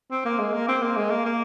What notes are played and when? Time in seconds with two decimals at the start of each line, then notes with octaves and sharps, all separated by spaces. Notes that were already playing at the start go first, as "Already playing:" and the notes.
0.11 C4
0.25 A#3
0.39 G#3
0.53 A#3
0.68 C4
0.82 A#3
0.96 G#3
1.11 A#3
1.26 A#3